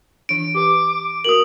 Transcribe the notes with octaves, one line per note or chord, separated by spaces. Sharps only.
E3 D4 D7
G4 B4 D6
A#3 F#4 A#4 D#6 F#7